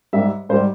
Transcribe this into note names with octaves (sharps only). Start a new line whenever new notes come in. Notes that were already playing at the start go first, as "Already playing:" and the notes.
G#2 G3 E5
G#2 G3 C5